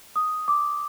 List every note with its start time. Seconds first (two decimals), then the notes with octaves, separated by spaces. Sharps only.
0.16 D#6
0.48 D6